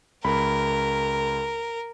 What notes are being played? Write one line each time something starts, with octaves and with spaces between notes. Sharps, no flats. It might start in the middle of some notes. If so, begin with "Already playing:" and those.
C#2 A#4 B5